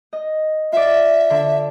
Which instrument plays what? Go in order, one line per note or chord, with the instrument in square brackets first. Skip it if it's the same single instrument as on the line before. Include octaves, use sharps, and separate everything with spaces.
[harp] D#5
[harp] F4 D5 [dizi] E5
[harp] D3